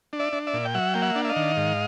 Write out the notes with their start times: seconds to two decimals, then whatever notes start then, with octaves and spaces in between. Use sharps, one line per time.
0.13 D4
0.19 D5 E5
0.33 D4
0.47 D5 E5
0.54 A#2
0.65 G5
0.74 F#3 E5 F#5
0.94 A#3 G5
1.02 E5 F#5
1.16 D4
1.25 E5
1.29 D#5 F5
1.36 D#3
1.57 G#2